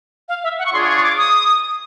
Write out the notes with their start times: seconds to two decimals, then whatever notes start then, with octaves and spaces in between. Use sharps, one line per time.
0.29 F5
0.44 E5
0.59 F#5
0.66 C#6
0.73 D4 F4 G#4 C#5 C6
0.88 C#6
0.98 C#6
1.03 D6
1.17 D#6